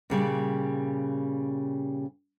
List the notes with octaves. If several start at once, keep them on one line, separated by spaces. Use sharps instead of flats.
A#2 C#3 G3